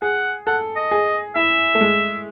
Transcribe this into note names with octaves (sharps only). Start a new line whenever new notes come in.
G#4 F#5
A4 F#5
D#5
G#4
E4 E5
A3
G#3